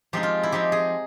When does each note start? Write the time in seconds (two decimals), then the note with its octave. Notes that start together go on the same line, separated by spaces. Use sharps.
0.13 F3 G#3 C4 D#4 G4
0.23 F4
0.43 E4
0.52 F3 G#3 C4 D#4 G4
0.72 G#4